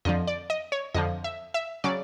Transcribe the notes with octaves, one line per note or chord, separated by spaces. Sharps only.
F2 D3 F3 D#5
D5
D#5
C#5
F2 D3 F3 D#5
E5
E5
C#3 F#3 D5